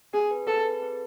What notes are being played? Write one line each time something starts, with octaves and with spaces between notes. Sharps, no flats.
C4 G#4
G#4 B4
C4 A4
G#4 B4
C4